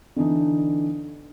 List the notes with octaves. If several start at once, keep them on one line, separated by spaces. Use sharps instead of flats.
D3 E3 D4 D#4